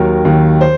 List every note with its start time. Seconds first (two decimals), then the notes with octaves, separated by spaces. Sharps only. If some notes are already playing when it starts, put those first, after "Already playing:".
Already playing: D#2 D#3 F#3 A#4
0.25 D#2 D#3 F#3
0.61 C5